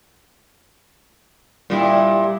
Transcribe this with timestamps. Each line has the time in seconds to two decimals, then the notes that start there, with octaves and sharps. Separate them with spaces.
1.70 A#2 G3 E4